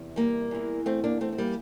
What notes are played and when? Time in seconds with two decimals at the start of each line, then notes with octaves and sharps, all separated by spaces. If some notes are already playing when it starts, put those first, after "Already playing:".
Already playing: E2 C3
0.16 G3 A#3
0.51 E2 E3
0.86 A3 C4
1.04 A#3 D4
1.21 A3 C4
1.32 C4
1.38 G3 A#3